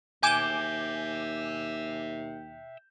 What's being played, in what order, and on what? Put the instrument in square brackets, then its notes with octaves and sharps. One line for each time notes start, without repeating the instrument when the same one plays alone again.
[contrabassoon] D#2 [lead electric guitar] E5 G5 [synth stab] G#5 D6 [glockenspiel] G6 E7 G7